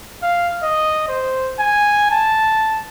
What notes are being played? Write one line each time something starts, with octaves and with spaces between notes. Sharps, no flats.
F5
D#5
C5
G#5
A5